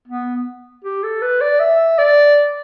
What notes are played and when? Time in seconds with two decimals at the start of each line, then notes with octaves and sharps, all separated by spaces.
0.08 B3
0.85 G4
1.04 A4
1.22 B4
1.41 D5
1.60 E5
1.99 D5